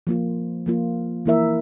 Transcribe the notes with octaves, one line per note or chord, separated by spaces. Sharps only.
F3 A#3 F4
F3 A#3 F4
E3 A#3 E4 A#4 E5